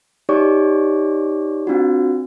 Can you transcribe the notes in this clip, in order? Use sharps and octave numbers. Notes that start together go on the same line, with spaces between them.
D#4 G4 C#5 D5 C#6 D6
C4 D4 F4 F#4